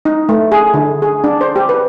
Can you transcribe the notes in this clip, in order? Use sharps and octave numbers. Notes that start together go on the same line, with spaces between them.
D#4
A3
G#4
D3
G#4
D4
C5
G4
B4